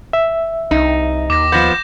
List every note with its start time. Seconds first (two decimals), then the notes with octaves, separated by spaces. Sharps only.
0.13 E5
0.71 C2 D#4
1.30 D#2 D6 A#6
1.52 F3 B3 G6 A#6 E7